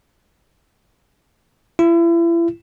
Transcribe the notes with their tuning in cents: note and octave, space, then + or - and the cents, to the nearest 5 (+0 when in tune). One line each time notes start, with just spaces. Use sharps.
E4 +35